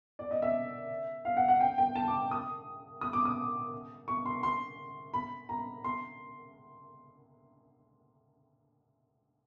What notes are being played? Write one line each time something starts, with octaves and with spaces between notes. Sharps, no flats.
D5
D#5
E5
F5
F#5
F#5
G5
G5
A5
D6
D#6
D#6
D6
D#6
C#6
C6
C6
B5
A#5
C6